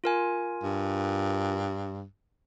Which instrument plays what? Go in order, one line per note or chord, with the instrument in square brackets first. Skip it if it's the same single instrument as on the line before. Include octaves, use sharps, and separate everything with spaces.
[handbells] F4 A#4 G#5
[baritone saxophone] G2